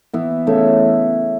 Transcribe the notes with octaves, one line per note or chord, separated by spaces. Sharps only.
E3 B3 E4
C#3 A3 E4